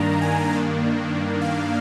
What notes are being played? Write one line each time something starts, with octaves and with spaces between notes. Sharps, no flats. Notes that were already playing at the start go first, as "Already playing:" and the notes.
Already playing: G2 D#3 A#3 D4 A#5
G#5
G2 D#3 A#3 D4
F5